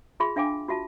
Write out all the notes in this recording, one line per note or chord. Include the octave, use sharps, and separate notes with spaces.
F4 G#4 E5 B5 C6
D4 E5 F5 G5 G#5 D6
F4 F#4 E5 A5